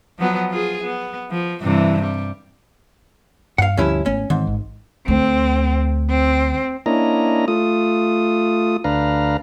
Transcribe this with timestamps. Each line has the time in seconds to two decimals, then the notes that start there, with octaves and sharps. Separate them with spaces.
0.19 F3 F#3 B3
0.50 F4 G#4
0.84 B3
1.31 F3
1.62 G2 C3 E3
2.02 G3
3.58 G2 F5 F#5
3.77 D2 G2 F3 C#4 E4
4.06 G#1 A3 B3 C#4
4.30 G#2 D#3 E3 C4
4.47 G#1
5.08 D2 C4
6.10 C4
6.86 A#3 C#4 D4 E4 D#5 A#5
7.48 A3 F4 D#6
8.84 D2 D4 B4 F5 A#5